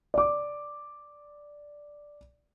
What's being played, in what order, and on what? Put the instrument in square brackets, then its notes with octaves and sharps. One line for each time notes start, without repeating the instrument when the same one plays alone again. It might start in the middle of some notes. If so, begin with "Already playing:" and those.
[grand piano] D5 D6